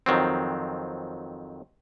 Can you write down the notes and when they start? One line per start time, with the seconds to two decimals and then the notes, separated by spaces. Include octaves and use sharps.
0.06 F2 D#3 F#3 C4